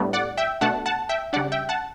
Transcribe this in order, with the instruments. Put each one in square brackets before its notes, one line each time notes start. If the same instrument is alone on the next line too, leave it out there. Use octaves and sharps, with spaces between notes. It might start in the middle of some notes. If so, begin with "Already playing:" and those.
Already playing: [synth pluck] A2 G3 B3 D4
D5 F#5
E5 G5
B2 A3 D4 F#5 A5
F#5 A5
E5 G5
C#3 G3 D4 D5 F#5
E5 G5
F#5 A5